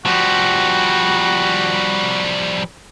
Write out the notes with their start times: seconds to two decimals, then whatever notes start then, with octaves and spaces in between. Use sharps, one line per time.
0.06 F3 G3 F#4